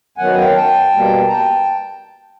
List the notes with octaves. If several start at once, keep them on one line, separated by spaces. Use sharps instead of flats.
F#2 D#3 F#3 B3 F#5 G#5
F5 G5
G5 A5
B2 G3 A#3
A#5
G5 A5